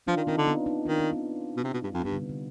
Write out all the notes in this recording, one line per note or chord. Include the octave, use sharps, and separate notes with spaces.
F3 D4 F4
D#3
D#3 C4 D#4
D3
B3 D4
C4 D#4
D#3 D4 F4
C4 D#4
B3 D4
B2
C3
B2
G2
F2
G2 G3 B3
D3
C3
D3